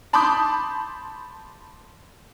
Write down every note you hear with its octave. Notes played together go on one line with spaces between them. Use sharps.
A5 B5 C6 D6 D#6 G6